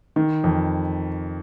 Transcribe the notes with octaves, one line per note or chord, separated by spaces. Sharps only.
D#3
F2